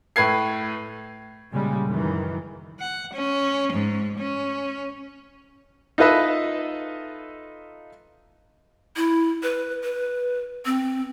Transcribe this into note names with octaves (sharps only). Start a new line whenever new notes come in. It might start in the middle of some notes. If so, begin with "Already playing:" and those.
A2 B4 G#6 C7
A#2 C#3 G3 G#3
F#2 D#3 E3
F#5
C#4
G#2
C#4
D#4 F4 A4 B4 D#5 E5
E4
B4
B4
C4